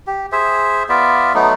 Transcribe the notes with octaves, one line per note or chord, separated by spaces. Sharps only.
G4
G#4 C5 E5
B3 F4 D5 E5
F#3 A3 B3 D#4